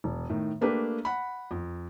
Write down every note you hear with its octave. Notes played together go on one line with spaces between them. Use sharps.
E1
A2 D#3
A3 A#3 D4 G4 B4
F#5 B5
F2